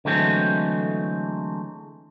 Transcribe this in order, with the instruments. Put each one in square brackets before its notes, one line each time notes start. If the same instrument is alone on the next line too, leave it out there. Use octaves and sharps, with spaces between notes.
[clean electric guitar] D3 E3 F#3 G#3 A3 C4